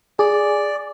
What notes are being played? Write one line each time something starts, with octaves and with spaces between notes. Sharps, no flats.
G#4 D5